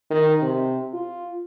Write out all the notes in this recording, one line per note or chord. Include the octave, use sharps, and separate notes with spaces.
D#3
C3
F4